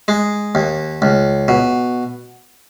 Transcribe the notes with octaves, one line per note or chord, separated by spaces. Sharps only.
G#3
D#2
C#2
B2